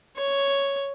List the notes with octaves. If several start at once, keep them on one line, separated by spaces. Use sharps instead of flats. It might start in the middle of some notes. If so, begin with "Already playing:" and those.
C#5